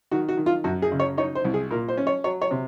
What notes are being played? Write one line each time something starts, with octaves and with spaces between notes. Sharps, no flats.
D#3 F#4
F#4
D#3
F4
F#2 F#4
G#4
C#3
C#5
D#4 C#5
C5
C2
G#4
A#2 A#4
C5
C#4
C#5
F#3 C#5
C#5
C3